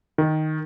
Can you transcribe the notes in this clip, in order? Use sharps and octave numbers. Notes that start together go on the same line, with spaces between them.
D#3